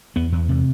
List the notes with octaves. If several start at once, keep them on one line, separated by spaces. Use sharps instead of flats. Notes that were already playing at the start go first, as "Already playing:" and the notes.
E2 B3
E2
C3